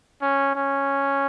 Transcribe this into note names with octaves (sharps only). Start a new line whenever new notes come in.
C#4
C#4